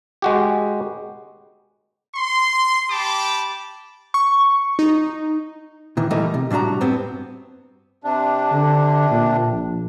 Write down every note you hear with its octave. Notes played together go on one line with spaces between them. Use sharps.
G#3 F#4 G4
C6
G4 A5 B5 D6
C#6
D#4
A#2 D#3 E3
E3 G3 A3 A#3 D#4
C3
A2 G3 D4 F#4 A#5
G2 B3 C4
C3 D4
D3
A#2
A#1